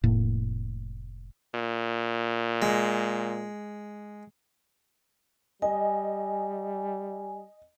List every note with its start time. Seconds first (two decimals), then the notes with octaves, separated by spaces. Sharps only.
0.04 F1 A2 A#3
1.54 A#2
2.62 G#3
5.62 G3 D#5 G#5